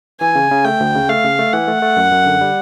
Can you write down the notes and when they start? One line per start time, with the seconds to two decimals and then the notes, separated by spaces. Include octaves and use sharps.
0.21 E3 G#5
0.35 C#3
0.51 C#3
0.65 A3 G5
0.80 D2
0.95 C#3
1.09 A3 F5
1.24 C#3
1.39 A3
1.53 E3 F#5
1.67 A3
1.82 A3
1.97 F#2
2.12 F#2
2.26 D3
2.41 G3